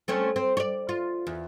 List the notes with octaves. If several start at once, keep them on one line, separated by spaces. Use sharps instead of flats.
A3 C4 C#4
C4
C#5 D5
F4
E2